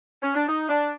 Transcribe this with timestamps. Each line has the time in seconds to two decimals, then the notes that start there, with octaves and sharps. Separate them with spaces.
0.22 C#4
0.35 D4
0.47 D#4
0.69 D4